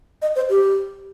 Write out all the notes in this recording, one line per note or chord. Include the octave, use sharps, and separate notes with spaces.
D#5
C5
G4